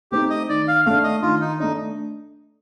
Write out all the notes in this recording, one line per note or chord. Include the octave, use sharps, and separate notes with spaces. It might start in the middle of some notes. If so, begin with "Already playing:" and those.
A3 C4 D#4 G4
D#5
D#3 D5
F5
A3 D4 F5
D#5
D#3 F4
D#4
A3 D4 D#4